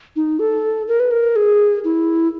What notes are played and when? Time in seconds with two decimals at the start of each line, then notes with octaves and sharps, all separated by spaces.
0.16 D#4
0.39 A4
0.88 A#4
1.00 B4
1.11 A#4
1.36 G#4
1.84 E4